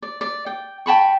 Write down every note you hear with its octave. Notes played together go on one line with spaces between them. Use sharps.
D5
D5
G5
G5 A5 B5 C#6